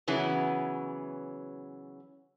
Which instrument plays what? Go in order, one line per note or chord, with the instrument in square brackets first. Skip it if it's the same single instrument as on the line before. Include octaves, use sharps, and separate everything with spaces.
[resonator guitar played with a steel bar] C#3 E3 F#3 B3 C#4